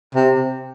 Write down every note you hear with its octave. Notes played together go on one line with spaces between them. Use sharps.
C3